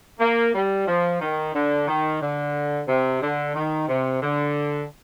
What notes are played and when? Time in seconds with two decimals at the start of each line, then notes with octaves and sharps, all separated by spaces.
0.20 A#3
0.55 G3
0.87 F3
1.21 D#3
1.54 D3
1.88 D#3
2.21 D3
2.88 C3
3.22 D3
3.55 D#3
3.89 C3
4.22 D3